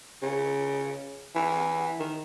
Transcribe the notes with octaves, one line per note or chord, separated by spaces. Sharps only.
C#3
E3
D#3